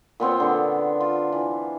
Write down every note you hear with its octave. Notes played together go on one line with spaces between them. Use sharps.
A#2 B3 C4 C#5
D3 B3 D4
F4
E3